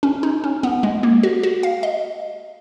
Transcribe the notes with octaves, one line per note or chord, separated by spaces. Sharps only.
C#4
D#4
C#4
B3
G#3
A#3
F#4
F#4
F5
D#5